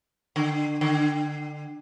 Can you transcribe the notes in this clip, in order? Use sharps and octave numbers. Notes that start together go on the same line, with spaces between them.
D3
D3